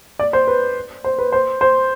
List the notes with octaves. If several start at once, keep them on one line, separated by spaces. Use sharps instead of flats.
D5
C5
B4
C5
B4
C5
C5